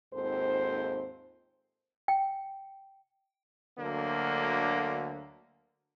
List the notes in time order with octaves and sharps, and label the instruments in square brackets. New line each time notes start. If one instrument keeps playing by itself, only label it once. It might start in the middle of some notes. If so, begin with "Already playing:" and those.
[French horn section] D#2 G#2 C4 F4 A4 C5
[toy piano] G5
[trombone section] D2 D3 F#3 A#3